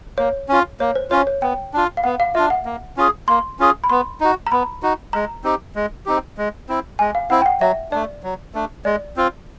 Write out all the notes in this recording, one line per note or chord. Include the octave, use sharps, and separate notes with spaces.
A#3 C#5
C#4 F4
A#3 C#5
C5
C#4 F4 C#5
C#5
B3 G5
D4 F4
F5
B3 F#5
F5
D4 F4 E5
F#5
A#3
C#4 F4 G#4
A#3 C6
C#4 F4 G#4
B5
B3 C6
D#4 F#4
A#5
B3 B5
D#4 F#4
G#3 A#5
C4 D#4 G4
G#3
C4 D#4 G4
G#3
C4 E4
G#3 G#5
F5
C4 E4 F#5
G5
F#5
F#3 E5
A3 D4 D5
F#3
A3 D4
G#3 D5
C4 F4